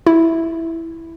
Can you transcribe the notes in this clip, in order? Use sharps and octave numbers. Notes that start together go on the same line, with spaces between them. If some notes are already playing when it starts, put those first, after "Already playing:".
E4